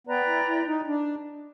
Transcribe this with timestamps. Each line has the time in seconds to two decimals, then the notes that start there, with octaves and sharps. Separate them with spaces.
0.07 B3 B4 D5 G5 A#5
0.27 E4
0.47 E4
0.67 D#4
0.87 D4